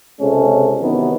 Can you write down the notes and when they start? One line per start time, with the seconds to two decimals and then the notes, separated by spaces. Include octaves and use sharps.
0.20 C#2 C3 G#3 C#4 A4
0.81 C3 D#3 E3 F#3 B3